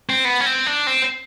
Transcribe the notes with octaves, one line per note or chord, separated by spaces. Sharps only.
C4
B3
C#4
C4
D4
C4